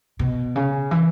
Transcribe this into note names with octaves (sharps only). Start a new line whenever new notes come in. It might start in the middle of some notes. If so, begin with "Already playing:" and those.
B2
C#3
E3